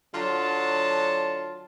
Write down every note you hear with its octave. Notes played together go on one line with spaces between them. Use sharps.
D3 F#3 F4 A5